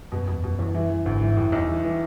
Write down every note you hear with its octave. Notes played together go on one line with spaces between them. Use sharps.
F#2 B2
E2 B2
F#2 B2
E2
E3
E3
G#1 D2 G#2
G#1 G#2 E3
F#2 A2
B1 E2
E3
E3